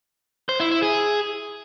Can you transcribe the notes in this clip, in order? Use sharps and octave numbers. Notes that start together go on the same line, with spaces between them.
C5
E4
E4
G#4